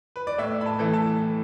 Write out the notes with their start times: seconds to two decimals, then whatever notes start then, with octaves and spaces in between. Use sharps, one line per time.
0.16 B4
0.27 D5
0.38 A2 E5
0.61 B5
0.66 A5
0.79 E3 A3 E4
0.93 A5